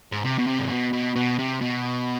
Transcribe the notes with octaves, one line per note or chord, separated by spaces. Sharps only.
G#2
C3
B2
C3
G#2
B2
B2
B2
C3
B2